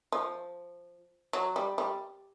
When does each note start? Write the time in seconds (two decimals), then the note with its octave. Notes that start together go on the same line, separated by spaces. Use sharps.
0.12 F3
1.33 F#3
1.56 G3
1.78 G3